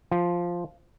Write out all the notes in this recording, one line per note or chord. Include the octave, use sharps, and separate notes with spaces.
F3